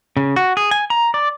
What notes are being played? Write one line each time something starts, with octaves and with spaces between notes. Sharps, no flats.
C#3
F#4
G#4
G#5
A#5
D5